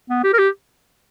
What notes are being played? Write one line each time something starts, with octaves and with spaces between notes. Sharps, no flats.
B3
G4
A#4
G4